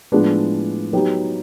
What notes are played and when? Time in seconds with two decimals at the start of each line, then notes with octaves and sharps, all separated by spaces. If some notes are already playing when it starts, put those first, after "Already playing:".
0.12 A2 F3 G#3 B3 D4
0.93 F#3 B3 D#4 G4